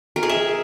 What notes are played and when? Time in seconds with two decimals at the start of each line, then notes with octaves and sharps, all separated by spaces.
0.16 A#4
0.23 G#4
0.29 E5